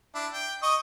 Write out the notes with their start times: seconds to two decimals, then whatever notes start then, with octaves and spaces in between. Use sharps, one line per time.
0.15 D4 E4
0.33 G5
0.63 D#5 C#6 D#6